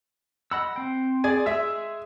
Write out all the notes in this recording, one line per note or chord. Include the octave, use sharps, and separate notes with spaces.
D#5 F#5 B5 E6
C4 G5
G#4 D5 G#5
G#3 G#4 E5 E6